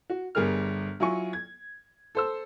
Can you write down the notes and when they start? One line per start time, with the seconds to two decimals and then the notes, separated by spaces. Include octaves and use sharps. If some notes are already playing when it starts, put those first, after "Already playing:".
0.10 F#4
0.35 G1 G3 G#4 A#4 F6
1.00 F#3 E4 F4 G#5 C#6
1.33 G#6
2.15 A4 C5 E6